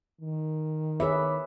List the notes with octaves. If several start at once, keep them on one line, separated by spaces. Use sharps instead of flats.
D#3
G#4 B4 C#5 E5 B5 D6